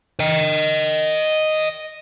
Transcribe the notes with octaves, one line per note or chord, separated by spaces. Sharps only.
D#5 G5